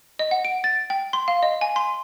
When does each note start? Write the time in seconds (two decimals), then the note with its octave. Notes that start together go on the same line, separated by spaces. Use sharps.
0.19 D#5
0.31 F#5
0.45 D7
0.64 A6
0.90 G5
1.13 C6
1.28 F5
1.43 D#5
1.61 G#5
1.76 C6